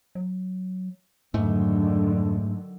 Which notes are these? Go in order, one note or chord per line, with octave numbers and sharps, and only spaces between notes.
F#3
F2 G#2 D3 D#3 F#3 A3